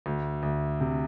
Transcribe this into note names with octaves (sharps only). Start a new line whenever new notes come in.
D2
D2
C3